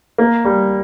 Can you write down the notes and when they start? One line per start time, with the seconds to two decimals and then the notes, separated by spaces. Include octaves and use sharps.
0.18 A#3
0.45 G3